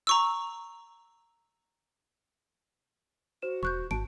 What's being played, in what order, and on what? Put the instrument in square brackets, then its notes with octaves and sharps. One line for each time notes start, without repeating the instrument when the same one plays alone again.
[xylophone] A#5 C#6 E6
[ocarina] F#4 [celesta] C5 E7
[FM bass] E1 [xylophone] C#6 F#6 G6
[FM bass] G#1 [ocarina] F#4 [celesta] A5 [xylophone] D7